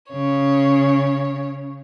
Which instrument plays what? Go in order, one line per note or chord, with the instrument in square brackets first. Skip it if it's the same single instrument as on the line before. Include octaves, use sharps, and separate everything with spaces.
[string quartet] C#3 C#5